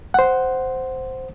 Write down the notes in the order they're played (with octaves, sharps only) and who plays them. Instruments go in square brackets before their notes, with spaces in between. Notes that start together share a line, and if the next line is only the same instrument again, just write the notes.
[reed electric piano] C5 F#5